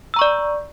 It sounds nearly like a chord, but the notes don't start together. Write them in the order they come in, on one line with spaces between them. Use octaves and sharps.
E6 A#5 C#6 D5